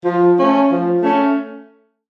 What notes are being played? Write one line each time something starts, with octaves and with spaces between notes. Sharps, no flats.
F3
A3 C#4
F3
A3 C#4